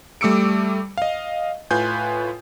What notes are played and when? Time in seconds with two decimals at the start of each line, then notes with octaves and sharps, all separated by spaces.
0.21 G3 A3 D6 E6 C#7 D7
0.97 D#5 F5
1.71 A2 F4 B4 G#5 G6